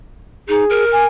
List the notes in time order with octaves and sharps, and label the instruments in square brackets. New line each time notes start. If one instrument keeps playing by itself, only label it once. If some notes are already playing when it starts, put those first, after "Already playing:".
[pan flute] D#4 [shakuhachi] G#4
[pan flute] A#4
[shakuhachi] G#5